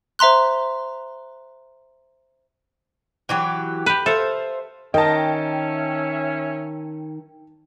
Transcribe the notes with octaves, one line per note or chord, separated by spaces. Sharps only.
C5 E5 A#5 C6 F#6
E3 F#3 G4
G4 B4
A4 C5 E5 F5
D#3 C#4 A#4 D#5 E5 G5 A5